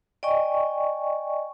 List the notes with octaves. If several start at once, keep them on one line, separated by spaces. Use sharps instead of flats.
D5 D#5 G5 G#5 C#6